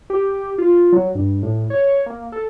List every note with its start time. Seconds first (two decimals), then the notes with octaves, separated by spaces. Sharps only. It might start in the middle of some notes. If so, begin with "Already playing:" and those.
0.10 G4
0.58 F4
0.93 F#3
1.15 G2
1.42 A2
1.70 C#5
2.06 A#3
2.32 A4